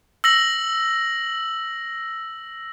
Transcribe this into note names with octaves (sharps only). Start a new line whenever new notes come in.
E6 A#6 F#7